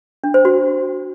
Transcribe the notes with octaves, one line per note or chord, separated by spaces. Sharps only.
D4
C5
F#4